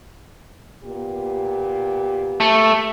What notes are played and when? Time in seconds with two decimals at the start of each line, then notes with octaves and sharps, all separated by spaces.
0.83 A#2 B3 G4
2.40 A3